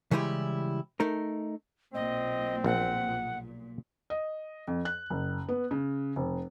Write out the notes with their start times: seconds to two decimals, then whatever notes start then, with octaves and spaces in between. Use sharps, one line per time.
0.11 C#3 E3 G3 G#3 E4 G4
1.00 A3 D#4 A#4
1.94 B1 A#2 C4 D#5
2.64 A#1 F#5
4.10 D#5
4.68 F2
4.85 F#6
5.10 F#1
5.49 B3
5.71 C#3
6.16 F1